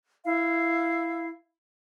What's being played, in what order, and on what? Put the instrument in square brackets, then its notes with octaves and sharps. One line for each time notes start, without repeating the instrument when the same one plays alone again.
[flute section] E4 F5